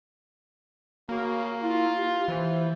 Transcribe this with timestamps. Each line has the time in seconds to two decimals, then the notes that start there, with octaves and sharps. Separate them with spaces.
1.09 C#3 A#3 F#4
1.61 E4 F4
1.96 G4
2.28 E3 C5